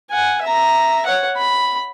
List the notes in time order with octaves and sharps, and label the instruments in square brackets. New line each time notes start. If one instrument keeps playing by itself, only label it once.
[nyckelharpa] F#5 G#5
E5 A#5
C#5 F#5
B5